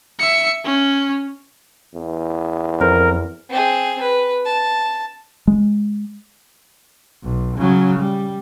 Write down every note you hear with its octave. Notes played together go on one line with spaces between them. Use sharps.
E5 C#7
C#4
E2
F2 A#4 C5
C4 G#4
B4
A5
G#3
B1
C#3 F#3
G3